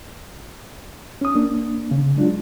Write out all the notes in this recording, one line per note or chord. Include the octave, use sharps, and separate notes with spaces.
C#4 D#6
A#3 D4
C#3
F#3 G#3 D4 F4